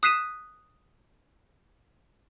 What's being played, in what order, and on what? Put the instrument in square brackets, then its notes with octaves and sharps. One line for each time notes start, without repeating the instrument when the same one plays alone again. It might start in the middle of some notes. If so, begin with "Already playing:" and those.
[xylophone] D#6 F#6 B6 C7 D#7 E7